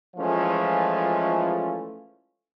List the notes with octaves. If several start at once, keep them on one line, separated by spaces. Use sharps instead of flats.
E3 F3 G#3 A3 C#4 F4